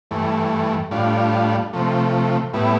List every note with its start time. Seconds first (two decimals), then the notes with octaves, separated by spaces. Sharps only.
0.11 G2 E3 A3
0.91 A2 G3 D4 F4
1.73 C3 F3 A3
2.53 A2 G3 B3 E4